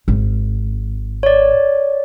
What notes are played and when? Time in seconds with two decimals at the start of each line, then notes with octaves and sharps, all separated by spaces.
0.08 G#1
1.23 C#5 D5